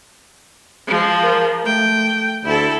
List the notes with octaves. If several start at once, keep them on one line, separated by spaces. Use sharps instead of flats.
F3 G#3
A#4
A3 G5
D2 E4 A4